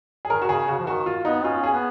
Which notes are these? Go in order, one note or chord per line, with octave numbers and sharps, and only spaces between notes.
G#4
D#3 A#4
F#4
C#3 G#4
C#3 F#4
F3
D#3 F#4
F4
B3 D#4
C#4 F4
G#4
B3